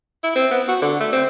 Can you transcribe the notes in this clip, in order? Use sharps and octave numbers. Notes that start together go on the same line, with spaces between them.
E4
C4
B3
F#4
D3
A3
C4